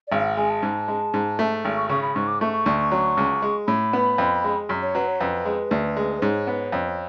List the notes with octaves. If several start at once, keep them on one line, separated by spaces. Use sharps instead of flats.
D5
G#1 F5
F#5
G#3 G#5
A5
G#2
G#3
G#2
A3
G#1
C#6
C#3 C#6
B5
G#2 C#6
D6
A3 C#6
C#6
D2
F#3
C#2
G#3
A2 B5
B3
F2
G#3
F#2
C#5
F#3 B4
C#5
F2 B4
G#3
D2
G#3
B4
G#2 C#5
B3
F2